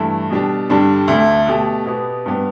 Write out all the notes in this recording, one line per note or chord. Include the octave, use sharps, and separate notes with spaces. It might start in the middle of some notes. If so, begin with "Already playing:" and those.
Already playing: G2 E3 A3 E4
B2 G3 D4 G4
G2 D3 G3 D4
D2 D3 A3
B2 A3 G4
B2 B3 G4
G2 G3 B3 G4